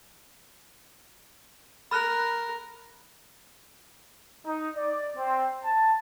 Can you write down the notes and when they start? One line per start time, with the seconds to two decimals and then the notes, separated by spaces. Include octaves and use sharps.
1.91 A#4 B5 F6 F#6
4.46 D#4
4.76 D5
5.17 C4
5.63 A5